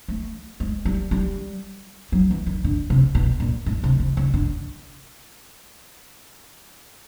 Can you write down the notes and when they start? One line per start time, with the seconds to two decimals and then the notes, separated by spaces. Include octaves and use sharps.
0.08 A3
0.60 G#3
0.85 G3
1.11 G3
2.12 F#3
2.31 E3
2.46 D#3
2.64 D3
2.90 C3
3.15 B2
3.40 A#2
3.66 A2
3.84 C3
4.00 C3
4.17 C#3
4.34 D3